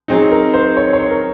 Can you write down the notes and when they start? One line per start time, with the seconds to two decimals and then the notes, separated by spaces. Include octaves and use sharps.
0.08 F#3 C4 D#4 G#4
0.31 A#4
0.54 C5
0.77 C#5
0.93 C#5
1.11 A#4